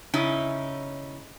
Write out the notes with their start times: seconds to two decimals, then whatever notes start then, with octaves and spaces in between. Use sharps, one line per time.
0.14 C#3 C#4 D#4 E4